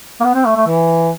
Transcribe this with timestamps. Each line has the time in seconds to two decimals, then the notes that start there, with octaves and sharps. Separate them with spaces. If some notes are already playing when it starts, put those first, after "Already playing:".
0.20 A#3
0.25 B3
0.35 C4
0.46 A3
0.57 A3
0.67 E3